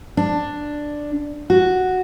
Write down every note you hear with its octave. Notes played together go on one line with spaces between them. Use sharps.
D4
F#4